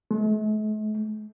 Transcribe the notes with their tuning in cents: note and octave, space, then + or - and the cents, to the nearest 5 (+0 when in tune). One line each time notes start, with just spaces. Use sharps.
A3 -45